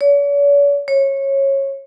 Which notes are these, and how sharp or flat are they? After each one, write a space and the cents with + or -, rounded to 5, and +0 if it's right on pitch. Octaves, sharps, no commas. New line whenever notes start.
C#5 +45
C#5 -20